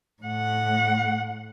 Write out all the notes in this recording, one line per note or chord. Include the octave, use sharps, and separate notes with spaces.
A2 F#5